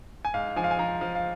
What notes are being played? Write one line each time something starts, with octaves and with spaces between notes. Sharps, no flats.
G#5
G#2 F5
F3 G#5
F5
G#5
F3 A#5
F3 F5
F5